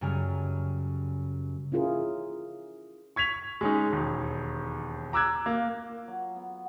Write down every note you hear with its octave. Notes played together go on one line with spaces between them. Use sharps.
F#2 C#3 G3 G#5 F6
C#4 E4 F4 G#4 A#4
C#6 G#6 B6 F7
G#3 C#4 D#4
E1 D#2
A#5 D6 E6 F#6 G#6
A#3
F4
F#3
B3